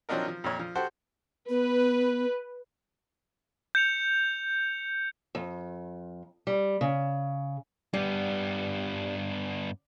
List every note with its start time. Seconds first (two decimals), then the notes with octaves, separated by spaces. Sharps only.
0.09 F3 F#3 C4 D4 D#4 A#4
0.28 F3
0.44 F2 A#2 C#5
0.59 F3
0.75 F#4 G4 A4 C5 F#5
1.49 B3 B4
3.75 G6 C#7 F7
5.35 F2
6.47 G3
6.81 C#3
7.94 G2 G3 B3